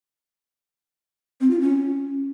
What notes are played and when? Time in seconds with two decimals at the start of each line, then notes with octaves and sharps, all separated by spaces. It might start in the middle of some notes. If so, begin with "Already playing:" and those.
1.41 C4
1.50 F4
1.60 C#4